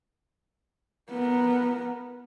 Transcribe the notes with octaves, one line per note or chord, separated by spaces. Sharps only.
B3 A#4